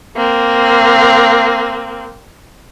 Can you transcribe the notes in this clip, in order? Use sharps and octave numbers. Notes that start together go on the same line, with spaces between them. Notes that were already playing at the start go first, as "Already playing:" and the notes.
A#3 C4